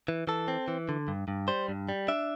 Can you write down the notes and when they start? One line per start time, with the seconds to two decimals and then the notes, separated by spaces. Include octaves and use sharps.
0.08 E3
0.27 E3 A4
0.48 C4
0.68 E3
0.89 D3
1.08 G2
1.28 G2
1.48 G3 C5
1.69 G2
1.89 G3
2.08 D4 E5